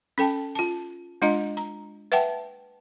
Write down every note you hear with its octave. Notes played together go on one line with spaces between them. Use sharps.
C#4 A4 G5 A5
F4 A5
G#3 D4 F4 D#5 A#5
A#5
B4 E5 F#5 G5 A5